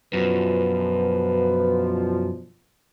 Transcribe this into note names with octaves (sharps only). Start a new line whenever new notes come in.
F#2 B2 D3 F3 B4